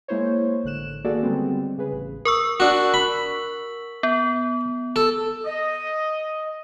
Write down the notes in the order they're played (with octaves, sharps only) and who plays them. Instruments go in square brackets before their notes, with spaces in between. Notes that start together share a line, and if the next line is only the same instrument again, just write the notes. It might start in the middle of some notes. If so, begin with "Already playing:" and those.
[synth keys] G#3 A#3 E4 C5 C#5
A1 D3 F#6 E7
D#3 A#3 F#4 G#4 A4 D5
D3 G3 G#3 B3 C4
C#3 G#4 B4
A1
[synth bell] A#4 C#6 E6
[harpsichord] D4 F#4
B5
[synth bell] B3
[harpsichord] A4
[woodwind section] D#5